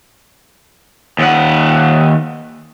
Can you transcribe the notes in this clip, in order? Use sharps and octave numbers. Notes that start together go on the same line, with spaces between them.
D#2 F#5